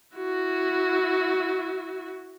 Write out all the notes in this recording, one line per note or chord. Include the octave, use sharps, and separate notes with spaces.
E4 F#4